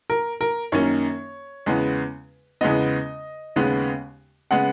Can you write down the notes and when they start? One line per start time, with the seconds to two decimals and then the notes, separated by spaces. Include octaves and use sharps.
0.10 A#4
0.41 A#4
0.72 F#2 D#3 A#3 C#4 C#5
1.66 E2 C#3 G#3 B3
2.61 E2 C#3 G#3 B3 D#5
3.56 D#2 C#3 G#3 B3
4.51 C#3 G#3 B3 F#5